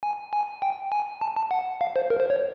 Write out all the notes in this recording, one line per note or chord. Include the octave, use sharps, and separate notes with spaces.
G#5
G#5
G5
G#5
A5
A5
F#5
F5
C5
A#4
C5
C#5